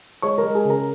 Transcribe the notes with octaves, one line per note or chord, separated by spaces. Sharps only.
G#3 C#5 C#6
A#4 A#5
G#3
G#4 G#5
C#3
A#4 A#5